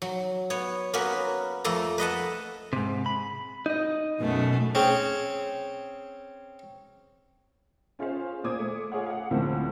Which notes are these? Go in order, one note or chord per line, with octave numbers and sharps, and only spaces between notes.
F#3
B3 C#5
A#3 B3 C#4 F#4 A#4 B4
F2 A3 A#3 A4 A#5
B4 D#5 F#5 A5
G#2 C3
B5
D#4 D#5
F#2 B2 A3
C4 C#4 G#4
C#4 F4 G#4 C5 F5
A#2 A#3 C5 D6 D#6 G#6
A3
F4 G#4 C#5 F#5
F5 F#5
D2 A2 F3 G#3 A#3 C4